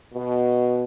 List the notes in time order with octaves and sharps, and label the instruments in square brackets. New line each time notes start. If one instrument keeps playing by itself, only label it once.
[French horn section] B2